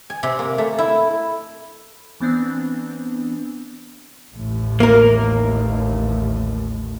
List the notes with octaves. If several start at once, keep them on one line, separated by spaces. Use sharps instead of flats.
G#5
C3
A#3
A3
E4
E3 B3 C4 D4
A1 D#2 A2
A#3 A#4